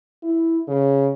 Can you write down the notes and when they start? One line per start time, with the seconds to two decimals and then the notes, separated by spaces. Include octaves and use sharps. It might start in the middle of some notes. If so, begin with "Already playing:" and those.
0.23 E4
0.68 C#3